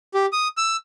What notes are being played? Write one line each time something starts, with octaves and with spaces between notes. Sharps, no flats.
G4
D#6
E6